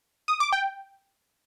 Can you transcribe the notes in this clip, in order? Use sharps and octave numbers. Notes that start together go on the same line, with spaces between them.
D#6
D6
G5